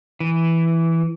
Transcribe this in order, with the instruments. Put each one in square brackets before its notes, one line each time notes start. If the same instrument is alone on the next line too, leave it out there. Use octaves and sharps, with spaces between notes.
[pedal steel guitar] E3